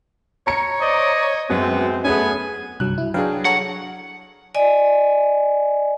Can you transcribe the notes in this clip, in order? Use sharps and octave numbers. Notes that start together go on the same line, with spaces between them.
C#5 A#5 C#7
C5 D5 D#5
F#2 G#3 B3 C4
A3 B3 C#4 G#4 G#5
C2 G2 F#3 F#6
E4
F#3 D4 G#4 B4 F5 G5
A4 C#5 F#5 A#5
D5 D#5 G#5